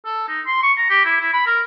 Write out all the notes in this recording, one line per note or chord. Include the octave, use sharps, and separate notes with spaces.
A4
D#4
C6
C#6
A#5
G4
E4
E4
B5
A#4